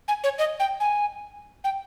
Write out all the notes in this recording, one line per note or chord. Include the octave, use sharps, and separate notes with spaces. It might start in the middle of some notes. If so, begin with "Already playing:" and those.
G#5
C#5
D#5
G5
G#5
G5